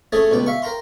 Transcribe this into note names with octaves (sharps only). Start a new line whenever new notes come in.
A3 C#4 G#4 A4
C#2 B2 G5
E5 F5 C#6
A#4 G5 A#5 C6